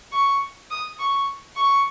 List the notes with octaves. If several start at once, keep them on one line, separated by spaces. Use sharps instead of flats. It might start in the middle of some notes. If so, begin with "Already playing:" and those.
C#6
D#6
C#6
C#6